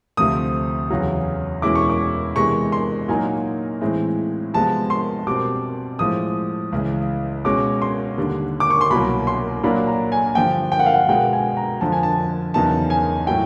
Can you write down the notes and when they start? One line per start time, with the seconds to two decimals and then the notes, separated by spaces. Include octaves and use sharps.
0.17 D2 C3 F3 A3 C4 D#6
0.90 E2 C#3 F#3
1.62 E2 B2 G#3 C#4 E4 D6
1.75 C#6
1.89 D6
2.36 C3 E3 G#3 B3 C#6
2.72 C6
3.08 A#2 F#3 A#3 D#4 G#5
3.81 A2 E3 G#3 C4
4.54 C3 F3 G#3 B3 A5
4.90 C6
5.27 B2 G3 C4 D6
5.99 A2 F3 G#3 D#6
6.72 C#2 C#3 E3
7.45 B2 G#3 C#4 D6
7.82 C6
8.17 D#2 D3 G3
8.60 D6
8.70 C#6
8.81 C6
8.90 C2 B2 F#3 A#3 B5
9.27 C6
9.63 A#2 F#3 A#3 D4 B5
9.87 A#5
10.12 G#5
10.35 G2 D3 F3 G5
10.72 G5
10.79 F#5
10.86 F5
10.94 F#5
11.09 B2 G#3 B3 G5
11.33 G#5
11.57 A#5
11.81 F2 D3 F3 A5
11.92 G#5
12.03 A5
12.54 E2 C#3 F#3 B3 D#4 A5
12.90 G#5
13.27 A2 F#3 A3 G5